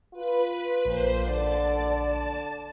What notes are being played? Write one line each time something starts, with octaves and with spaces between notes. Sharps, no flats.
F4 B4
A#1 A#2 C5
D3 D5 A5